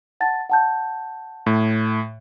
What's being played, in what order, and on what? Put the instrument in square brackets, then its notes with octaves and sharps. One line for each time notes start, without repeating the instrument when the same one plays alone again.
[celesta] F#5 A5 A6
F#5 A5 G6
[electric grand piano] A2